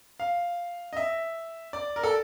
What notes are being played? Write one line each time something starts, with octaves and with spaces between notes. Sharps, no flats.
F5
D#5
E5
D5
A#4
A4